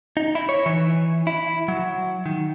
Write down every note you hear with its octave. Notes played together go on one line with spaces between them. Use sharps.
D#4
E4
C#5
E3
E4
F#3
D#3